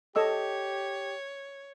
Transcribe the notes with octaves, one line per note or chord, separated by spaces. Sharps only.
G4 A4 C#5 D#5 E6